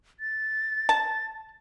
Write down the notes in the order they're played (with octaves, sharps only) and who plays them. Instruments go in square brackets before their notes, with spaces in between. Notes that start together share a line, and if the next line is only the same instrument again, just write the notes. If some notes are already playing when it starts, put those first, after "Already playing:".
[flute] A6
[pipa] A5